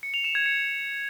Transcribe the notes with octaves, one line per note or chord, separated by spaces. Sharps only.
C#7
F7
E7
G#6
C#7